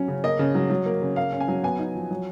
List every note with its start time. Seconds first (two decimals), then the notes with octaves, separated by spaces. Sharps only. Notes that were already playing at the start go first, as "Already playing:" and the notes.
Already playing: F#3 C#4
0.08 C#3
0.24 A#3 D#5
0.39 C#3
0.55 F#3
0.70 F#3
0.86 A#3
1.02 C#3
1.16 A#3 F5
1.33 C#4
1.40 G#5
1.48 F#3
1.63 B3 G#5
1.79 D#4
1.95 F3
2.11 F#3